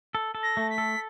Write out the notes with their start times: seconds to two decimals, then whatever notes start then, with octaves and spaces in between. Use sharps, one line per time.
0.15 A4
0.35 A4
0.43 A#6
0.57 A3
0.70 B6
0.78 A4